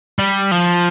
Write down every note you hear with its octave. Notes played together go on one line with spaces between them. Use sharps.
G3
F3